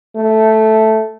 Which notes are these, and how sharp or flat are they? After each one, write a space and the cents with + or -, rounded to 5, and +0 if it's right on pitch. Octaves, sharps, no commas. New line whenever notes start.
A3 -5